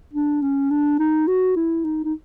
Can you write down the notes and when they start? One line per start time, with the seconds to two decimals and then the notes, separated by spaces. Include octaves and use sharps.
0.14 D4
0.42 C#4
0.71 D4
0.99 D#4
1.28 F#4
1.56 E4
1.85 D#4
2.05 D#4